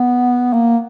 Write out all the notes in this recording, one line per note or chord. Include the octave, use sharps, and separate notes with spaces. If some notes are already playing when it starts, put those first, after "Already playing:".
Already playing: B3
A#3